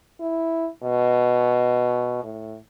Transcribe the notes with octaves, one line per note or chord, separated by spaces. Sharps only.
E4
B2
A2